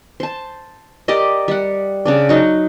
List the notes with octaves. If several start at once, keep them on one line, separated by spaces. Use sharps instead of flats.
C5 A5
G4 A#4 D5 D#5
G3 F#5
C#3 D4 D5
F#3 D#4 F#4